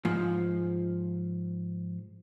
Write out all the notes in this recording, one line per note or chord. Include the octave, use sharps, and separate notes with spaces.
G#2 F3